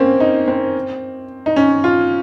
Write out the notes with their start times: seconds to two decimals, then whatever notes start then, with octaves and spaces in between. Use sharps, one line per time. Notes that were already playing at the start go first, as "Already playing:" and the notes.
Already playing: A#3 C4 C#4
0.20 D#4
0.48 C4
1.46 D#4
1.56 C#4
1.84 F4